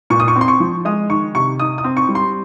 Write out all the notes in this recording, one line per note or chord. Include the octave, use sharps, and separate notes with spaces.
A#2 C#6
D#6
C#6
C4
C6
C#6
F3
G#3 D#6
D#3 C#6
C3 C#6
D#4 D#6
D#6
C4
C#6
G3
C6